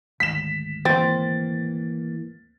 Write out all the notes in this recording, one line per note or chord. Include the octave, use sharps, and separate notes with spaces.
D2 G#2 D#3 B6 E7
E3 A#3 C4 A6